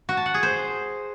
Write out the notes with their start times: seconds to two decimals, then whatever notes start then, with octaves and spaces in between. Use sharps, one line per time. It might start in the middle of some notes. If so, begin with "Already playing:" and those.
0.09 F#4
0.17 A5
0.26 F#5
0.34 G#4
0.43 C5